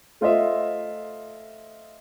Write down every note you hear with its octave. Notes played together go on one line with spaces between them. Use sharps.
A3 F4 C5 D#5 E5